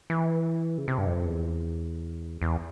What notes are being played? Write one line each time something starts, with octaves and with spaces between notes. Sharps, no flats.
E3
C#3
C3
G2
F2
E2
E2